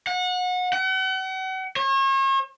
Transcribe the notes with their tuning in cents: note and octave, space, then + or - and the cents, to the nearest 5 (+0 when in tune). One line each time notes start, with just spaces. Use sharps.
F#5 -30
F#5 +40
C#5 -40